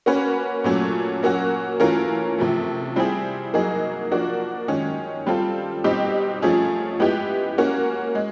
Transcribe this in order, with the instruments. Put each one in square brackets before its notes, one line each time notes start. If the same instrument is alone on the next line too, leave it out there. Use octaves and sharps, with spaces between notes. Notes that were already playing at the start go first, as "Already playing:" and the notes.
[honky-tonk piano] A#3 C#4 F#4 B4
A#2 F#3 A3 C#4
F#3 A#3 C#4 F#4
E3 A3 C#4 F4 A#4
C3 F3 A3
G3 C4 E4 G#4
F#3 A#3 D#4 G#4
F3 A#3 D4 F#4
D#3 G#3 C#4
G3 C4 F4 A4
B2 G3 C4 D#4 G4
F3 A3 C#4 F4 G#4
G#3 B3 E4 G4
A#3 C#4 F#4
G#3